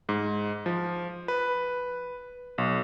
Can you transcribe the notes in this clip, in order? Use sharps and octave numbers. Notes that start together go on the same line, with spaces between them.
G#2
F3
B4
B1